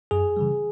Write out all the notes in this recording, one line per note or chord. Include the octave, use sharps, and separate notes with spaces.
F#2 G#4
C#3 E3 G3